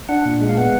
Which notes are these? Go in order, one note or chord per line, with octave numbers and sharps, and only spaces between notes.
D4 F#5
A#2
G#3
F5
B3 F#5